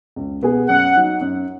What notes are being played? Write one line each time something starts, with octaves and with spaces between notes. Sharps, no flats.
C#2
B2 B3 G#4
F#2 F#5
F#3 D#4
F#2